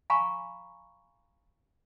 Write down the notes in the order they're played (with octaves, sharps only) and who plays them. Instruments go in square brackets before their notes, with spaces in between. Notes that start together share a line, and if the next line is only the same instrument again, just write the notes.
[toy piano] F5 G#5 A#5 B5 C#6